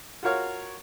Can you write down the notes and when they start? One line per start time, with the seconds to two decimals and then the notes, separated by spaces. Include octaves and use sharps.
0.23 F4 F#4 A#4 C#5 F5